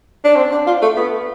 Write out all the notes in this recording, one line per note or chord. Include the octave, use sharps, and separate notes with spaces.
D4
C4
D4
F4
A3
B3